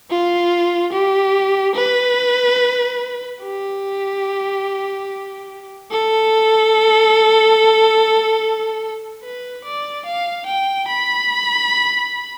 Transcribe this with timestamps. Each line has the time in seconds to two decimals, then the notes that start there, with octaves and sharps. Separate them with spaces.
0.10 F4
0.93 G4
1.76 B4
3.43 G4
5.92 A4
9.23 B4
9.64 D5
10.06 F5
10.46 G5
10.88 B5